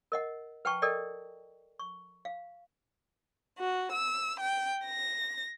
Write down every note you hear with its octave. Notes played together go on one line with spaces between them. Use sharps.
A#4 D#5 F#5
B4 F#5 G5 A5 C#6
A4 A#4 D5 D#5 G5
C#6
F5
F#4
E6
G5
A#6